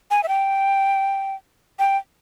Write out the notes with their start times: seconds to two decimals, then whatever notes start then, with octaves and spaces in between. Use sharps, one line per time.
0.11 G#5
0.23 E5
0.28 G5
1.79 G5